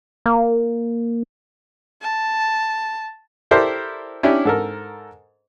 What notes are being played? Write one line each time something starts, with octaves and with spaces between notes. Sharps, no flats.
A#3
A5
E4 G4 A4 A#4 C5 D5
C#4 D4 E4 G4
G#2 A4 A#4